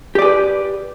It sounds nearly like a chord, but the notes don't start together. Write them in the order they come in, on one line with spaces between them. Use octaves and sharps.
G4 D5 G#4 B4